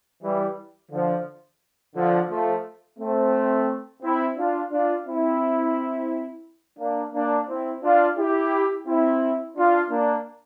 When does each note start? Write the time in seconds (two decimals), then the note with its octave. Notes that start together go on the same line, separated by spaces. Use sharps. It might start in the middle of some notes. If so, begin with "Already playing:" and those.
0.22 E3 G3
0.92 D3 F3
1.95 D3 F3
2.30 F3 A3
2.99 A3 C4
4.03 C4 E4
4.37 D4 F4
4.71 D4 F4
5.06 C4 E4
6.79 A#3 D4
7.14 A#3 D4
7.48 C4 E4
7.83 D4 F4
8.18 E4 G4
8.87 C4 E4
9.56 D4 F4
9.90 A#3 D4